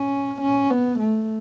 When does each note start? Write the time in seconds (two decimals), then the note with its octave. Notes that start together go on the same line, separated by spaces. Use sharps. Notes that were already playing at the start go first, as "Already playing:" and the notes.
Already playing: C#4
0.41 C#4
0.70 B3
0.99 A3